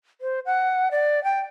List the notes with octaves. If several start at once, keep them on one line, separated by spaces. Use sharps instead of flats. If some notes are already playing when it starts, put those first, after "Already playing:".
C5
F#5
D5
G5